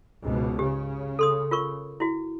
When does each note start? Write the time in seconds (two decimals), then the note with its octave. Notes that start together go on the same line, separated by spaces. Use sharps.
0.24 C#2 G#2 B2
0.59 C#3 G4
1.19 A4 C6 D#6
1.51 F4 A#4 C#6
2.00 E4 F#4